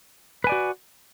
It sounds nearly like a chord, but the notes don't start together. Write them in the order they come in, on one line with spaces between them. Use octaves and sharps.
B4 G#5 D5 F#4